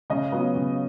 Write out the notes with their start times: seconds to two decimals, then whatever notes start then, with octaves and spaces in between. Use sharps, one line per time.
0.10 C#3 D#5
0.32 F#3 B3 F4
0.55 C#3